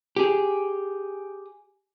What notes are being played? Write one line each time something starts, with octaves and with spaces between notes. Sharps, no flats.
G4 G#4